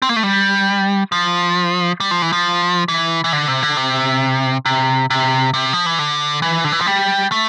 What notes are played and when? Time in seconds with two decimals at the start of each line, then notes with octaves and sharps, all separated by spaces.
0.02 C4
0.09 A#3
0.16 A3
0.23 G3
1.12 F3
2.00 G3
2.11 F3
2.22 E3
2.33 F3
2.88 E3
3.24 E3
3.33 D3
3.48 C3
3.63 D3
3.77 C3
4.65 C3
5.10 C3
5.54 C3
5.73 F3
5.86 E3
5.99 D3
6.42 E3
6.64 D3
6.72 E3
6.80 F3
6.87 G3
7.32 A3